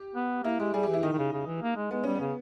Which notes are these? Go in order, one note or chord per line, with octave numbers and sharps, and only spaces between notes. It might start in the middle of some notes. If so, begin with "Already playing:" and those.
Already playing: G4
B3
A#3 E4
G#3 G4
G3 G#4
E3 G4
E4
D#3 D#4
D#3
C#3
C#3
E3
A#3
G#3
G#3 B3
G3 C#4
C#3 B3